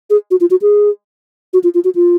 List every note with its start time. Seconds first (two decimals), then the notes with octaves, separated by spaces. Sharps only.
0.10 G#4
0.31 F#4
0.41 F4
0.51 F#4
0.62 G#4
1.53 F#4
1.64 F4
1.74 F4
1.84 F#4
1.95 F4